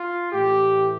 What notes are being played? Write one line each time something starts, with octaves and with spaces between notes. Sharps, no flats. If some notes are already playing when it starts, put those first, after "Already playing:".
Already playing: F4
A2 E3 G4